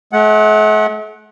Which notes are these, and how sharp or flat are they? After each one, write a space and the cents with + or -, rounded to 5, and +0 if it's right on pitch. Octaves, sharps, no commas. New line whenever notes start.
A3 -45 F#5 +0